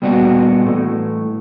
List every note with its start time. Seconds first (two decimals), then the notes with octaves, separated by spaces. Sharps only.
0.02 A#2 G3 B3 D4 F#4
0.65 A2 E3 A3